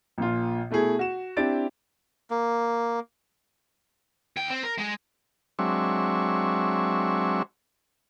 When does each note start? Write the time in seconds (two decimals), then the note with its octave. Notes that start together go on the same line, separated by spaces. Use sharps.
0.18 A#1 A#2 F4
0.70 B2 A3 E4 G#4
0.99 F#4 E7
1.37 C4 D4 E4 G4 A6 D7
2.30 A#3
4.37 D#2 G5
4.50 C4
4.63 A#4
4.78 G#3
5.59 F#3 G#3 C4 D4 E5 C#6